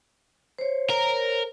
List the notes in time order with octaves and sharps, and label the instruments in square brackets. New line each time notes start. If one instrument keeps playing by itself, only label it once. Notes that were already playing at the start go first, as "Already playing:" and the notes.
[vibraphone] C5 C#5
[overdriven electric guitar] A#4